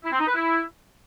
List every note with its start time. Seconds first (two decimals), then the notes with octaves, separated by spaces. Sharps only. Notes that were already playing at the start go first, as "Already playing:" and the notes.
0.04 E4
0.12 C4
0.20 D#4
0.27 B4
0.35 E4